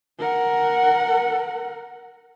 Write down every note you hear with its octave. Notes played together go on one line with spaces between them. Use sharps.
A#4 F#5